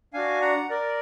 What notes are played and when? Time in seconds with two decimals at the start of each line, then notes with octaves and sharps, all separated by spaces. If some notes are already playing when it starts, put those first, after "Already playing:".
0.13 D4 F#4 F5 G#5
0.42 F#5 A#5
0.70 A#4 D5